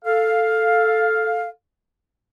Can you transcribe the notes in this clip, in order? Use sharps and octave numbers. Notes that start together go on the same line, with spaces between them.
A4 F5